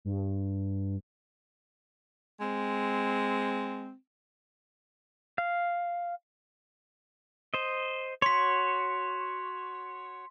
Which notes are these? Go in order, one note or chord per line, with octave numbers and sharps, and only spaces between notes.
G2
G#3 C4
F5
C5 D#5
F#4 C#5 C6 B6